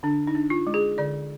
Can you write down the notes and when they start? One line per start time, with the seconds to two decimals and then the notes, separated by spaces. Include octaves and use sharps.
0.03 D3 D4
0.27 D#4
0.35 D4
0.50 F4
0.67 G#3
0.74 G#4
0.98 D3 D5